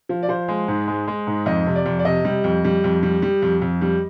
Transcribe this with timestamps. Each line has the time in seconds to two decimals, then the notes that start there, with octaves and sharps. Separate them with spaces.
0.09 F3
0.23 D5
0.29 F3 C5
0.48 G#3
0.68 G#2
0.88 G#3
1.08 G#3
1.27 G#2
1.46 F2 D#5
1.66 C3
1.76 D5
1.86 F2
1.99 D5
2.05 C3 D#5
2.25 G3
2.44 F2
2.64 G3
2.84 F2
3.03 G3
3.22 G3
3.42 F2
3.62 F2
3.81 G3